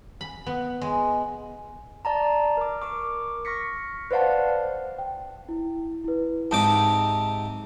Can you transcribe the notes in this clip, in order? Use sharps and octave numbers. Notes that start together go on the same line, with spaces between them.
B5
B3
G#3
D5 A5 A#5
A#4 D6
A#4 C#6 D6
C#6 F6 A#6 B6 C#7
B4 C5 D5 F5 F#5 A5
G5
E4
E4 B4
G#2 C3 A5 D6 D#6 G6